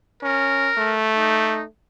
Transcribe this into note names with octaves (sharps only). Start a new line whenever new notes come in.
C#4 A#4
A3
D#4